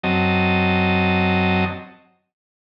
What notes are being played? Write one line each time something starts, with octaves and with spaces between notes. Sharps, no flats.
F#2 F#3 C4 D#5 A5